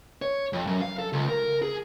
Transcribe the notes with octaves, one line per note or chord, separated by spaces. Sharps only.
C#5
F2
F#2
F5
A4
C#2
A#4
G#4